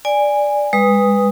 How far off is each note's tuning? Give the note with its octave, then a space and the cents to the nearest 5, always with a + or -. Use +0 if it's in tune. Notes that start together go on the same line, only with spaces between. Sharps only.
D5 +0 G#5 -15
G#3 -35 B4 +0 D#6 +0